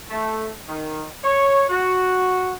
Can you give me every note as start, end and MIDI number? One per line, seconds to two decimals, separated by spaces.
0.11 0.49 57
0.67 1.06 51
1.24 1.64 73
1.70 2.53 66